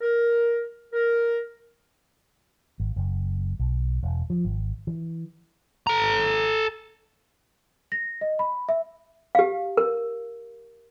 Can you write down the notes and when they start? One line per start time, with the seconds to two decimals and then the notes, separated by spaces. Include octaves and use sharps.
0.01 A#4
0.93 A#4
2.80 G#1
2.96 F#1
3.59 B1
4.03 E1
4.30 F3
4.45 G#1
4.87 E3
5.87 A4 A#5
7.92 A#6
8.21 D#5
8.39 B5
8.69 E5
9.35 G4 F5
9.77 A#4